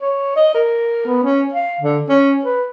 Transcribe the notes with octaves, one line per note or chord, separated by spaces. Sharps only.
C#5
D#5
A#4
B3
C#4
F5
D3
C#4
B4